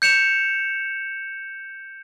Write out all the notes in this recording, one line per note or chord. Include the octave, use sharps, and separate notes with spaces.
G6 C#7 E7 F7